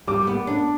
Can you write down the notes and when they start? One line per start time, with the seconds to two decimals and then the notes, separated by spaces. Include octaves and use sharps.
0.07 G3 D6
0.27 B3
0.47 D4